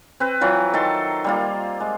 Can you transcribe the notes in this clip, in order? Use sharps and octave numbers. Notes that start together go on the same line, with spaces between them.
C4 B4
E3 F#3 F4
D#3 A4 A5 C6
G3 A#3 F4
G#3